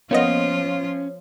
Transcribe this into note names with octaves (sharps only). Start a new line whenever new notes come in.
F3 A#3 B3 C#4 F4 C#5 D#5